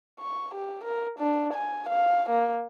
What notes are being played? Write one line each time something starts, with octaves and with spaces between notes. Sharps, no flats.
C#6
G4
A#4
D4
G#5
F5
A#3